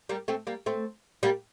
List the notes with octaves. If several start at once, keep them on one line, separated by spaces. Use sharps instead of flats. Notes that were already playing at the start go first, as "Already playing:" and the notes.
G3 A#3
A3 C4
G3 A#3
A3 C4
G3 A#3